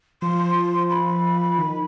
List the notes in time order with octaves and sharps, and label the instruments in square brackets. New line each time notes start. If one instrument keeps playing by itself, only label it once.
[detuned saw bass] F3 [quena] C6
[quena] B5
[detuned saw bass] D#3